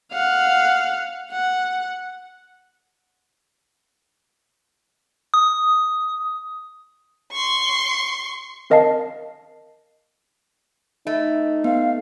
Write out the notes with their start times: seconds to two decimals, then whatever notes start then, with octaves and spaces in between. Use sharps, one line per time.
0.13 F5 F#5
1.32 F#5
5.34 D#6
7.33 C6 C#6
8.70 C4 A#4 D#5 F5 A5 C7
11.07 A3 D#4
11.64 B3 F5